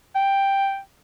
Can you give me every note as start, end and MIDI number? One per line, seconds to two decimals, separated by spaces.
0.15 0.79 79